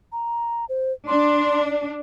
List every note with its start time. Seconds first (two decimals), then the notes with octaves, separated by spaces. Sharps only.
0.12 A#5
0.69 C5
1.07 D4 C6
1.65 D5